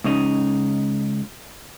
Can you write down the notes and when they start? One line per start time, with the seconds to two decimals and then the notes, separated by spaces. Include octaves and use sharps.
0.04 C#2 C#3 D#4